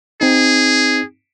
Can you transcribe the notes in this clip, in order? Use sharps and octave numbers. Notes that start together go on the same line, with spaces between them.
C4 D#4 G#4